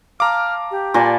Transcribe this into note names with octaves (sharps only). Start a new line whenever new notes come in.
F5 A5 A#5 D6 F6
G4
A#2 D5 G#5 A5 B5